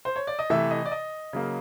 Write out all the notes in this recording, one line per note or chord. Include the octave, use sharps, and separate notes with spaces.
C5
C#5
D5
D#5
C3 E3 A3 E5
D#5
D5
D#5
C#3 F#3 A#3